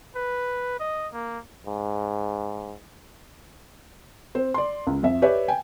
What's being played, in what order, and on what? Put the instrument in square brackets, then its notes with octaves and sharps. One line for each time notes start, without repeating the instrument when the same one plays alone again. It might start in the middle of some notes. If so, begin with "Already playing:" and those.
[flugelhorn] B4
D#5
A#3
[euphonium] G#2
[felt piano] C4 C5
D5 C6
C#2
F2 E5
G4 B4 C#5 D5 E5
G5 G#5